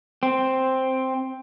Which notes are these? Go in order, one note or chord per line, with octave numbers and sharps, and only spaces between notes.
C4